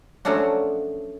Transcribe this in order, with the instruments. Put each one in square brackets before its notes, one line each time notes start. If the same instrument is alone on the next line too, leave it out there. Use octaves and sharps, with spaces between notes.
[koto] F3 F#3 A3 C#4 D4 F#4